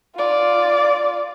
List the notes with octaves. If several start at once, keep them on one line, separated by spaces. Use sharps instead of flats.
F4 D5